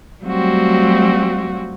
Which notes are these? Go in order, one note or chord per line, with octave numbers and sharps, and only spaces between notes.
F#3 G3 A3 C4 F4 F#4